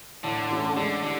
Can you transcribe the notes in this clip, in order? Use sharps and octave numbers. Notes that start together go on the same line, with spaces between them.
A2 D3
E3 A3 C#4 E4
D3 G#3
D3 E4 G4